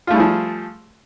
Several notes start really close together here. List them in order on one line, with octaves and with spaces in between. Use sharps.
F4 A3 G3 G#4 F3